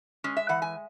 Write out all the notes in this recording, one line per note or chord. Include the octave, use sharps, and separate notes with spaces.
G#3 C#4
E5
E3 F#5
G#5